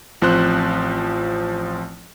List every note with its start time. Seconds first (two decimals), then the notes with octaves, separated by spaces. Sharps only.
0.22 A1 F3 C4 C5 F#6